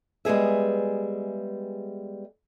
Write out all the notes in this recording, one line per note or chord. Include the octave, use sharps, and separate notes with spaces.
G3 G#3 B3 G#4 E5